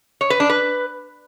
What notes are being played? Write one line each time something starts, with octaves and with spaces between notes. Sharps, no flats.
C#5
B4
D4
B4